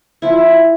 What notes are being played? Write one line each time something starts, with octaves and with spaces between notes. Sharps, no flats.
F3 E4